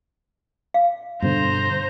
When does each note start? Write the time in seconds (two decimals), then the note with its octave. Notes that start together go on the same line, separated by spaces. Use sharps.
0.74 F5
1.22 G2 B2 D3 C5 A#5